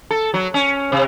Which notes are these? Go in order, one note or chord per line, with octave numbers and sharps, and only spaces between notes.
A4
F#3
C#4
C3